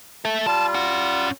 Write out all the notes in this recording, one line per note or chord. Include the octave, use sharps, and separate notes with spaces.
A4 E5
G3 F4 A5
C#4 F#5